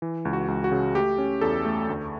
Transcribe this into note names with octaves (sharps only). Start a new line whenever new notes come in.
E3
C#2
F#4
C#2
F#4
C#3
A3 G4
C#4
E2 A4
A3
D2